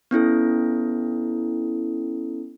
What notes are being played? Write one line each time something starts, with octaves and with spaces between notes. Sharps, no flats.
B3 C#4 E4 A4